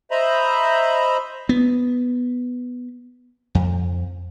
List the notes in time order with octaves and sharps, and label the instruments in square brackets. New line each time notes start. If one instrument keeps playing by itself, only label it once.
[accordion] C5 D#5 E5 A#5 B5
[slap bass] B3
F2